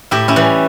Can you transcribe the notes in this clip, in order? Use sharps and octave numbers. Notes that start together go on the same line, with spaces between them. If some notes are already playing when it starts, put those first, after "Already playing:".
A2 E4 G4
C#4 E4
E3 G3